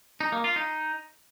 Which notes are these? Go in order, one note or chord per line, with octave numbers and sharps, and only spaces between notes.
D#4
A#3
F4
D#4